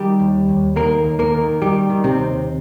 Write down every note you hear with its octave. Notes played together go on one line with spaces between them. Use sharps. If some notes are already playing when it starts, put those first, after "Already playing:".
Already playing: D#3 G3 G4
D#2
D#2
D#3 A#3 A#4
D#2
A#3 A#4
D#3
D#3 G3 G4
D#3
C3 C4
D#2